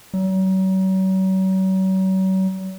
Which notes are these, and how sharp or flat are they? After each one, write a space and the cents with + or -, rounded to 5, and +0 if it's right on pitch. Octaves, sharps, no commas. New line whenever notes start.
F#3 +40